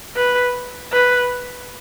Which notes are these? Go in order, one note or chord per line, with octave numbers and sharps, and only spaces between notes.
B4
B4